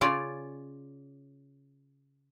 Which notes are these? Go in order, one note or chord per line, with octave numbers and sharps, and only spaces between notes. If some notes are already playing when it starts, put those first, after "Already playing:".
C#3 C#4 F4 D5 G#5